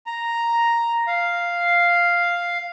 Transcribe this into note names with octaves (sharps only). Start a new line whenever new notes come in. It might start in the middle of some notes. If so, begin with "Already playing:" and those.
A#5
F5